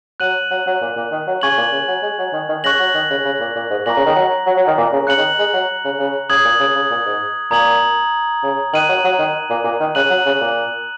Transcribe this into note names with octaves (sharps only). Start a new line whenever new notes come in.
F#3 F#6 D#7 F#7
F#3
F#3
A#2
A#2
D#3
F#3
C#3 G#5 C#6 G#6 F#7
A#2
C#3
F#3
G#3
F#3
D#3
D#3
C#3 C#6 F#6 A#6 F#7
F#3
D#3
C#3
C#3
A#2
A#2
G#2
A#2 A#5 C#6 A#6 F#7
C#3
D#3
F#3
F#3
F#3
D#3
A#2
C#3
C#3 F#6 C#7 F#7
D#3
G#3
F#3
C#3
C#3
C#3 D#6 G#6 F#7
A#2
C#3
C#3
A#2
G#2
A#2 A#5 D#6 G#6 F#7
C#3
D#3 F#6 D#7 F#7
F#3
F#3
D#3
A#2
A#2
D#3
C#3 F#6 D#7 F#7
F#3
C#3
A#2